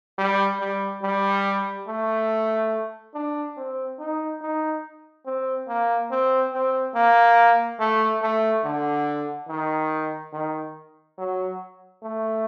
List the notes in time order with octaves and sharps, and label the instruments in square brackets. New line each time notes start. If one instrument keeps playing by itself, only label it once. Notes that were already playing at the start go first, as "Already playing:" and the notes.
[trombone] G3
G3
G3
A3
D4
C4
D#4
D#4
C4
A#3
C4
C4
A#3
A3
A3
D3
D#3
D#3
F#3
A3